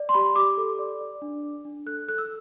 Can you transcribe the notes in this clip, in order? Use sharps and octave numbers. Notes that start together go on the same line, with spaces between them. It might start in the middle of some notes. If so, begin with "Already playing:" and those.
Already playing: D5
C6
G4 B5
G4 D6
A4
D5
D5
D4
D5
D4
A4 F#6
A4 F#6
E6